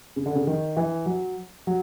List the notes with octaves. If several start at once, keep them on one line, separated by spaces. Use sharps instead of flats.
C#3
D3
C#3
D#3
E3
F#3
F#3